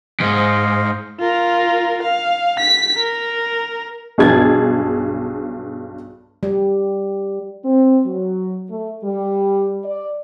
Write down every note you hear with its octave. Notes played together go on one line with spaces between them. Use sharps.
E2 G#2 C5 D#5 F5
F4 A#4
F5
B6
A#4
B1 G2 G#4 A5 G#6 A6
G3
C4
F#3
A3
G3
D5